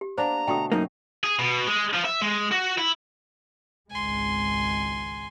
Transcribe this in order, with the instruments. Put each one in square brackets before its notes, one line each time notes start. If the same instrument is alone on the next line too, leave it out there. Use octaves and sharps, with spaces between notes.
[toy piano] G4
[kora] A#3 B3 D4 [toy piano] C5 [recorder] A#5
[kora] B2 D3 A3 [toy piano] G5 C#6 D#6
[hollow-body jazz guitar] F#2 A#3 [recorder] D#4
[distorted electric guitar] G#4
B2
G#3
F3
E5
G#3
F#4
E4
[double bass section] G#1 C#2 G#3 [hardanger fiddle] G#5 C6